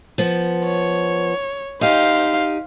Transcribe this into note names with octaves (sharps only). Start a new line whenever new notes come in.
F3 B3
C#5
D#4 G4 C5 F5